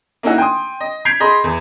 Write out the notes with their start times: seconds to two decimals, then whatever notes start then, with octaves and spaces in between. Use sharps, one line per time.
0.23 A#3 C#4 D#4 E4 F#4
0.38 G5 G#5 C6 D#6
0.81 D#5
1.05 G6 G#6 B6 C7 D7 F7
1.20 G#4 D#5 B5 C6
1.44 E2